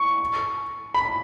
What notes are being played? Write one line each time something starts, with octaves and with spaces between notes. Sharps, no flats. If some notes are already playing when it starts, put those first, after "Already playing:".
Already playing: C#6
B5